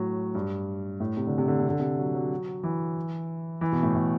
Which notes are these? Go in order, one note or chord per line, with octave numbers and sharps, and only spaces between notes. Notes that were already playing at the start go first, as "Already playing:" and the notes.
Already playing: A2 F#3
G2
A2
C3
D3
C3
D3
C3
D3
C3
F#3
F#3
E3
E3
B2
A2
A2